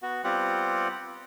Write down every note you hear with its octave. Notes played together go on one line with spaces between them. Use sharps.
B3 F#4
G3 B3 C4 F4 G4 F#5